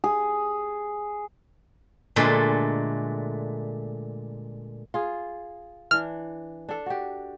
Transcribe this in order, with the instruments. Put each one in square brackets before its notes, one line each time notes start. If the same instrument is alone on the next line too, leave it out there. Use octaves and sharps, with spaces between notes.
[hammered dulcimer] G#4
[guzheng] A#2 D3 G#3 A3
[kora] F4 G#4
[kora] E3 D4 [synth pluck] F6
[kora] D4 A4
F#4 G4